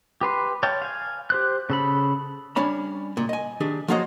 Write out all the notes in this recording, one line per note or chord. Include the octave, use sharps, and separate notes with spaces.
G4 B4 C6
C#5 F5 G5 A5
F5 G#5
G4 C5 F#6
C#3 A4 B5
G3 C#4 D4 C#5 B5
C#2 A#2
D#5 G#5
D#3 D4 G4 G#4
F3 A#3 F4 F#4 C#5 D#5